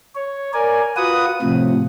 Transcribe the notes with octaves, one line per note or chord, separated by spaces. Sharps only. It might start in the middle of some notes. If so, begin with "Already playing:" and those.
C#5
A#4 D5 G#5
F4 F#4 B4 F#5 D#6
A2 C3 F3